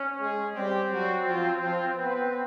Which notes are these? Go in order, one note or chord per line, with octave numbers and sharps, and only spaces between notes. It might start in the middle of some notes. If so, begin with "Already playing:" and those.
Already playing: C#4
G#3 G#4
G3 C4 G4
F#3 F#4
F3 F4
F3 F4
B3 B4